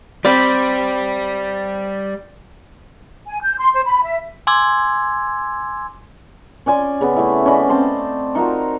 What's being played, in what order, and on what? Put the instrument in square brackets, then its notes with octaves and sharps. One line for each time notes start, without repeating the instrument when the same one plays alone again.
[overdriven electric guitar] G3 [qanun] C4 B5 [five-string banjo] D5
[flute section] G#5
G6
C6
C5
B5
E5
[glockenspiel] G#5 C6 D6 E6 G#6
[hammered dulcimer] C#4 D5 G#5 C6
C#3 B3
A3 E4
C#4 D5 D#5 B5
C4 A5 C6
D#4 F4 F#4 A#4